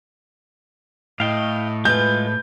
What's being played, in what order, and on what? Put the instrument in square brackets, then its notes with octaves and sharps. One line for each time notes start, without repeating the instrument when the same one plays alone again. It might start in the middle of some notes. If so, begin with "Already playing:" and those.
[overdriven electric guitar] A2 [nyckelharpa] D#5 [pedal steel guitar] F5 G5
[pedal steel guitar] G#3 F4 [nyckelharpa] B4 [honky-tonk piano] G6